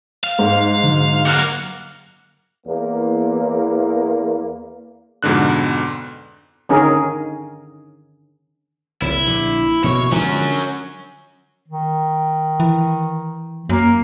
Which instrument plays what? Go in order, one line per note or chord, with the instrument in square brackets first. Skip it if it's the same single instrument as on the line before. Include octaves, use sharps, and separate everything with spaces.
[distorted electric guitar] F5
[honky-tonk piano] G#2
[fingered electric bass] D3 F#3
[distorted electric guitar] A#3 F#4 [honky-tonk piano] F6 F#6 C#7
[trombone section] E2 A#3
[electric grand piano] F2 G#2 B2 D3 F#6
[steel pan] D3 D#3 C#4 D#4 G#4 A#4
[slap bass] F#1 C2 E3 [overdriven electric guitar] E4
[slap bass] A#1 D3
[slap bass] B2 F#3 A#3 [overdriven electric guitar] C#5
[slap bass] D3 F3 G#3 [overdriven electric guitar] F#3 C#4
[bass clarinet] D#3
[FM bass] E3
[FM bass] F#2 [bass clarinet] A#3